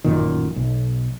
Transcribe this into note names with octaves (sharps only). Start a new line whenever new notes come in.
A1 F#2 A#2 D#3
B1